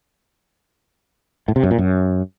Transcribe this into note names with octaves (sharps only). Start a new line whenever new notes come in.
A2
C3
F#2
A#2
F#2